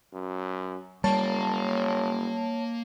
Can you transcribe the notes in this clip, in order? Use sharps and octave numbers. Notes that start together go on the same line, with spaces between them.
F#2
F#1 G3 A#3 C#5 A5